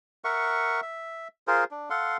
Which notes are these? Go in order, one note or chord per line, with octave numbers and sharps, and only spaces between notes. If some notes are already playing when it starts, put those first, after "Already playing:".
A#4 E5 F#5 C#6
E5
F4 G#4 A#4 C5
D4
A4 F5 F#5 C6